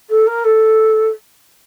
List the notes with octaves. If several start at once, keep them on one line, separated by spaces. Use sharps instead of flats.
A4
A#4
A4